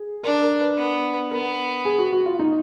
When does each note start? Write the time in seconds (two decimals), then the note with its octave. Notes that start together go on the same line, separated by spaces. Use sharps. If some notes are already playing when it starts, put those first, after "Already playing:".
Already playing: G#4
0.23 D4 A#4
0.41 A#4
0.60 B4
0.78 B3
1.31 B3 A#4
1.85 G#4
1.98 F#4
2.13 F#4
2.26 F4
2.39 D#4